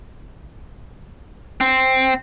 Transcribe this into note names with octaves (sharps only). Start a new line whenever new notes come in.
C4